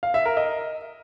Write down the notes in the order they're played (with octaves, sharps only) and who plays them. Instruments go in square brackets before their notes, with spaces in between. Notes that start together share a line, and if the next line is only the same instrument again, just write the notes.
[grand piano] F5
E5
A#4
D#5